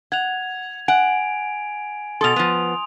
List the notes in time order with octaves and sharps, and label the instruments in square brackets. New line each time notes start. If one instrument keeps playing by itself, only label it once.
[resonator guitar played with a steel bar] F#5 [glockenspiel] G#6 F7
[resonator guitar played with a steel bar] F#5 [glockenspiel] G#5 D7
[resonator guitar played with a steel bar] B2 A4 [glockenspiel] C6 D#6 F7
[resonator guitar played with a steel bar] F3 B3